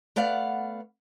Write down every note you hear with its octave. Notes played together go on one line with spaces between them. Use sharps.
A3 B3 D5 F5 F#5